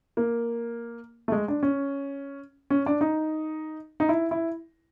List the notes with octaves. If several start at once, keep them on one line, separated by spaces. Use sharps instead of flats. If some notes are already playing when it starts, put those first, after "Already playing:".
A#3
A3
G#3
D4
C#4
C#4
D4
D#4
D#4
E4
E4